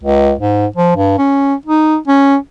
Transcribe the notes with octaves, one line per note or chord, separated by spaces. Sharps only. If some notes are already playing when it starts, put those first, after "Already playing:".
C#2
G#2
F3
G2
C#4
D#4
C#4